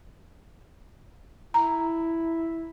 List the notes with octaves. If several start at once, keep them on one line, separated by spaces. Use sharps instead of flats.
E4 A#5